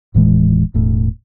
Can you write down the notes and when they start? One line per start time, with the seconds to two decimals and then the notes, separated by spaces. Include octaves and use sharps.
0.14 D#1 A2 E3 G#3
0.74 E1 A2